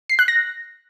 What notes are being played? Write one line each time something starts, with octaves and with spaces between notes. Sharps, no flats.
C7
F#6
A#6